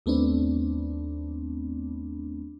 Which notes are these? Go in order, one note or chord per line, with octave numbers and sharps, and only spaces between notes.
D#2 A3 B3 C4 D4